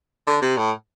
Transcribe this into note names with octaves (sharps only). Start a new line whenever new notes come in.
D3
C3
A2